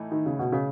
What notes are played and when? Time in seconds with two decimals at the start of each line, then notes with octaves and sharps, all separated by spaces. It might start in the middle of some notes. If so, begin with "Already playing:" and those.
Already playing: A2 E3 A3 D#4
0.11 D#3
0.26 C#3
0.39 B2
0.52 C#3